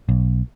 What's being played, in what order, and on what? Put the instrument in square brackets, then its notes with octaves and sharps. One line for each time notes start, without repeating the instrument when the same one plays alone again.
[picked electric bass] B1